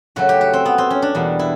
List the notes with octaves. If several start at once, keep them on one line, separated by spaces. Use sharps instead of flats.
F#2 C#3 F#3 A3 F#4
G4
F#4
C4
B3
C4
C#4
D4
E2 B2 G3 A#3
E4